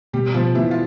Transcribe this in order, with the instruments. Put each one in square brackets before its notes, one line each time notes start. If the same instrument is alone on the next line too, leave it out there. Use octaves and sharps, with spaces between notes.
[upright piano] B2 [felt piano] G3 G4
[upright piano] B2 [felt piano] F3 F4
[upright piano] B2 [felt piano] E3 E4
[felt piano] F4